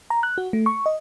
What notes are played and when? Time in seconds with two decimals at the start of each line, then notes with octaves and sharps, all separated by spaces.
0.10 A#5
0.23 F#6
0.38 F#4
0.53 A3
0.66 C#6
0.86 D#5